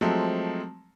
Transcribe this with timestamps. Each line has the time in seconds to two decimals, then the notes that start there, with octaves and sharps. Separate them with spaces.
0.01 F3 F#3 G#3 A3 C4